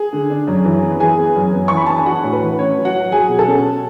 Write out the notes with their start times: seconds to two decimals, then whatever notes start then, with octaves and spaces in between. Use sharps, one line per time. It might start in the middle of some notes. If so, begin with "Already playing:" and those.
Already playing: G#4
0.13 D3
0.30 D4
0.47 F#2
0.65 E3
0.83 B3
1.00 E3 G#4 G#5
1.18 B3
1.36 F#2
1.53 B3
1.68 E3 C#6
1.77 B5
1.86 D4 A5
1.96 G#5
2.06 D4 F#4 F#5
2.24 A2
2.33 B4
2.42 E3
2.59 C#4 C#5
2.77 F#3
2.85 F#4 F#5
2.94 F#3
3.12 F#3 G#4 G#5
3.29 B2
3.38 A4 A5
3.47 C#4